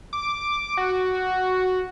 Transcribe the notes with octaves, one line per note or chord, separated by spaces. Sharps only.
D6
F#4